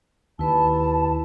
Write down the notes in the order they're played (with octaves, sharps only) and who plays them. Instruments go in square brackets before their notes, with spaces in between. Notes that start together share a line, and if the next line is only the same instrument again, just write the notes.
[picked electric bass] D#2 [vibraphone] E4 B4 B5 [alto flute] A5